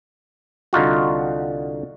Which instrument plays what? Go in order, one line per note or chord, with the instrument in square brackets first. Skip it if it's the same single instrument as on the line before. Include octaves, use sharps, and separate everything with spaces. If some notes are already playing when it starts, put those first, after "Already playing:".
[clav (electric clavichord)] C2 D3 D#4 F4 F#4